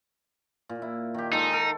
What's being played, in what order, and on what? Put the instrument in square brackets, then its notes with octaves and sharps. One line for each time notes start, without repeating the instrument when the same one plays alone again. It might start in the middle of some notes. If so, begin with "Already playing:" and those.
[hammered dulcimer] A#2
E4
D#3 G4
[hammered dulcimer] G#3 A4 [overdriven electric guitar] D#4
[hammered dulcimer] A4